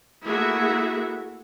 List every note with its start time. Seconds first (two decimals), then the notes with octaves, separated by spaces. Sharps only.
0.23 A3 A#3 E4 F#4 G#4 E5